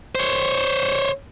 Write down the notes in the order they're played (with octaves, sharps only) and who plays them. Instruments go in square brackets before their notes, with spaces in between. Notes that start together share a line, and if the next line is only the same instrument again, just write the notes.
[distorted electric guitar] C5 C#5